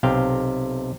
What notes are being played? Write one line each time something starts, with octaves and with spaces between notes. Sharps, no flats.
B1 C3 F5 G5